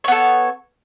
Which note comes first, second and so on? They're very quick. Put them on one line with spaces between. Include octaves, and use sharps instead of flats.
C#5 B3 A4